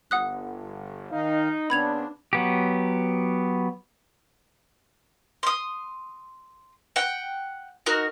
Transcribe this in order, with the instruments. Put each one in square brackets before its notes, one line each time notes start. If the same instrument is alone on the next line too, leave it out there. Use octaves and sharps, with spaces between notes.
[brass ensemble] G1 [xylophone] F#5 D#6 F#6
[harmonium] D#3 F5 [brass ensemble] D#4
[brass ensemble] C#3 B3 C4 [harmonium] D4 [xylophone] B5 G#6 F7
[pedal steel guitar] F#3 B3 G4
[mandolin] C6 D#6
F#5 G5
D#4 F#4 A#4